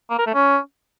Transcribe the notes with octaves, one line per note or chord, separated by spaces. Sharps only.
A#3
A#4
A3
C#4